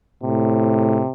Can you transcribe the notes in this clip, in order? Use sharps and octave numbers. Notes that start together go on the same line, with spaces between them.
A2 C3